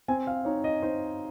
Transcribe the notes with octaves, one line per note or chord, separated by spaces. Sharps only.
C4 G#5
F5
D#4 C#5
D#5
D#4 C5